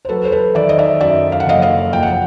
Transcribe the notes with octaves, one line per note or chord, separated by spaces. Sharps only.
C5
F#3 A4 B4
C5
A4 B4
D#3 D5 E5
D#5
D5 E5
F#2 D5 E5
F5
F#5
F#1 D#5 F5
D#5 F5
A#1 G5
F#5